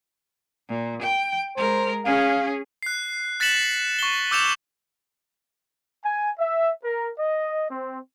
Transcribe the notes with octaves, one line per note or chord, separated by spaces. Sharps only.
A#2
G5
G#3 A#4 C5
C#4 G#4 F5
F#6 C7
F#6 A6 B6 C#7 E7 F#7
C#6 G7
D6 E6 G6 C#7 E7 F7
G#5
E5
A#4
D#5
C4